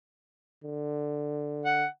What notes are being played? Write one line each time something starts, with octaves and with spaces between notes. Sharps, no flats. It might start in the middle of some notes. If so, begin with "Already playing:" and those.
D3
F#5